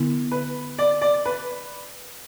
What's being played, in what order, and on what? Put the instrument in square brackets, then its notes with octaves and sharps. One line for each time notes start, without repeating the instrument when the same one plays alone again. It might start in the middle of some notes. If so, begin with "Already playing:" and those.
Already playing: [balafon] D3 B3 E4
[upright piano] B4
D5
D5
B4